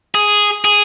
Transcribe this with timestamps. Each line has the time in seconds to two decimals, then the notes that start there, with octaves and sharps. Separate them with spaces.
0.15 G#4
0.65 G#4